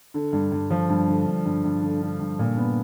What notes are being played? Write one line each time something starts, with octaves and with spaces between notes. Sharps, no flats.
D3
G2
G2
F3
G2
D3
G2
G2
G2
D3
D3
G2
A#2
B3